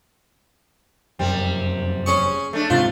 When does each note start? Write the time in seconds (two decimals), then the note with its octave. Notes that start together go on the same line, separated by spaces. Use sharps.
1.19 F1 F#2 G3 C4
2.06 C#4 G#4 C#6
2.53 A3 D4
2.70 D#1 G#2 C3 F4